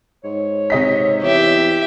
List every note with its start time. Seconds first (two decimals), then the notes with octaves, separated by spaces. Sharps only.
0.24 G#2 C#5
0.70 C3 D#5 B6
1.22 E2 G4 E5